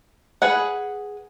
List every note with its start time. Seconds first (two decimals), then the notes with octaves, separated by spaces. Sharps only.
0.42 G#4 B4 F#5